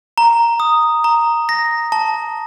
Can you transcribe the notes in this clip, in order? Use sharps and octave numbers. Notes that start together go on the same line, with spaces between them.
A#5
D#6
A#5
A#6
A5